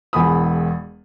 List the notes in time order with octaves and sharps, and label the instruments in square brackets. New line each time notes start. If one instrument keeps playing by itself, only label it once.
[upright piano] E1 E2 G#5 B5 D#6